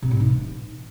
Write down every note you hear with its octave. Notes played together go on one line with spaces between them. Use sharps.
C3
A2
D#4
E3